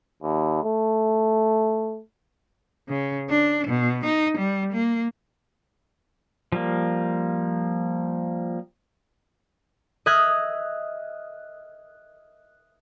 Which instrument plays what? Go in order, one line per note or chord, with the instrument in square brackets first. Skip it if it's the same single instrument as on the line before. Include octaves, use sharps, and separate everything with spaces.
[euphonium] D#2
A3
[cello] C#3
D4
B2
D#4
G3
A#3
[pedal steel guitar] F3 G3 A#3
[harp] D#5 E5 F6 F#6 G#6